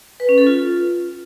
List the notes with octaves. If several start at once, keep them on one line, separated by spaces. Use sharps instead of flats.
B4
C#4
A4
F4